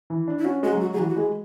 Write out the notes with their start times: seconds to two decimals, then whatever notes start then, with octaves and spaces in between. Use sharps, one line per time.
0.10 E3
0.28 D4
0.39 E4
0.45 C#4 F#4
0.63 G#3 F#4
0.73 F#3
0.81 F#4
0.93 F#3 G#4
0.99 E3 F#4
1.09 F#4
1.16 G#3 G#4